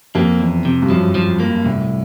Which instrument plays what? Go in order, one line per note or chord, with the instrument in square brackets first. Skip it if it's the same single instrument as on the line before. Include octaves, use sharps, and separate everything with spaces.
[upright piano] F2 [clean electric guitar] A#3
[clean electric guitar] E2
C3
[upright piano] G2
[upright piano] F#2 [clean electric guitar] F3
[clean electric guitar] F3
A#3
[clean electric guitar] C2 [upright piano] A2